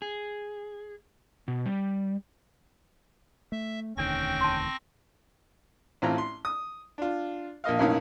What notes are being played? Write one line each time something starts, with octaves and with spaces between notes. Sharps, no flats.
G#4
B2
G3
A3 E5
E1 D2 D#3 C4 C#4 G5 C#6 A#6
A5 C6
A1 A2 C4 F4 A#5
C6
D#6
D4 F4
A#1 A#3 D#5 F5
B1 F#2 A2 A#3 C#4 D#4